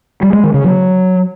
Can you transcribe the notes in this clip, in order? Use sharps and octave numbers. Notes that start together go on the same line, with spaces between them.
G3
G#3
D#3
C#3
F#3